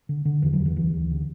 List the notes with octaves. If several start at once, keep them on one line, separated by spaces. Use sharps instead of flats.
D3
D3
E2 E3
F#3
E2
E3
D2 E3
D2
D3